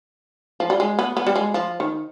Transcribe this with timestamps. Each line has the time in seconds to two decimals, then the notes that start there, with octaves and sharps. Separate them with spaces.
0.60 F3
0.70 G3
0.80 G#3
0.99 B3
1.17 B3
1.27 G3
1.36 G#3
1.54 F3
1.80 D#3